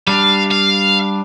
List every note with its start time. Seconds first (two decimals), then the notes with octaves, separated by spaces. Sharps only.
0.07 G3 D4 F5
0.51 F5